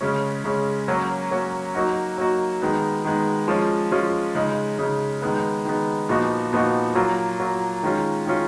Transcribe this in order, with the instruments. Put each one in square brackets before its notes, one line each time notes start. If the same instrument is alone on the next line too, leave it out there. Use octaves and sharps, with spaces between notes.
[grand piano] C#3 G#3 C#4
C#3 G#3 C#4
F#3 A#3 C#4 F#4
F#3 A#3 C#4 F#4
F#3 A#3 D#4 F#4
F#3 A#3 D#4 F#4
D#3 G#3 B3
D#3 G#3 B3
F3 G#3 C#4 F4
F3 G#3 C#4 F4
C#3 G#3 D#4
C#3 G#3 D#4
D#3 G#3 B3
D#3 G#3 B3
A#2 F3 B3 D#4 F#4
A#2 F3 B3 D#4 F#4
F#3 A#3 F4
F#3 A#3 F4
D#3 G#3 C#4 F4
D#3 G#3 C#4 F4